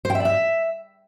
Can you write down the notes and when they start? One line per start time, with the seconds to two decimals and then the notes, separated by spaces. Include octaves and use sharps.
0.05 C5
0.10 G5
0.15 E5
0.20 D5
0.25 E5